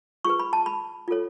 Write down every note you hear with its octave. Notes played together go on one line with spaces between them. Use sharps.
F4 G#4 B4 C#6
B5
A5
B5
F4 A4 C#5